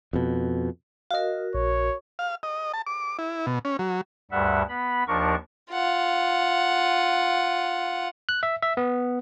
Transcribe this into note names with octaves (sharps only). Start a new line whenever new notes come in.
F2 B2
F#4 A#4 D#5 F5
A#1 C#5
F5
D#5
A5
D6
E4
B2
C#4
F#3
D2 G2 G3 E5 F#5
B3 B5
D#2 F3 D4 A#4 C#6
F4 F#5
F#6
E5
E5
B3